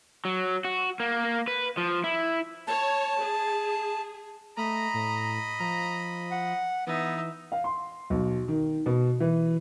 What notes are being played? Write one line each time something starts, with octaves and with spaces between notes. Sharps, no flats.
F#3
F#4
A#3
B4
F3
E4
C#5 A5
G#4
A3 D#5 A#5 B5
A2
F3 A#5
F#5
E3 B3 D#4 E5
F5
C6
B1
D#3
B2
E3